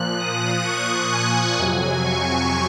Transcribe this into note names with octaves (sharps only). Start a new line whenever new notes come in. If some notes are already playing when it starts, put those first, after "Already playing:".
Already playing: A#2 F3 F#6
D#6
C#6
G#5
F2 C3 F#3 G#5
C#6